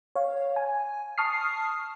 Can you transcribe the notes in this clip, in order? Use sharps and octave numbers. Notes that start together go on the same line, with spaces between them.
C#5 F5
G#5
A5 C#6 D#6 F6 C7